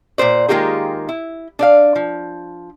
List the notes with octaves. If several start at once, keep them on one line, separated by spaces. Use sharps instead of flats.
A#2 F#3 C5 D5
D#3 G#3 A#3 F4 G4 G#4
E4
D4 D5 F5
F3